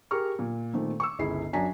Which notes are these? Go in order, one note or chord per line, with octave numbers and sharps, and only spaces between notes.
G4 G#4 A#4 A#5 C#6 F6
A#2
A#2 D#3 A3 C4
C#6 D6 E6
G1 C#2 E4 G#4 C7
F#2 F#3 D4 G#5 A#5 B6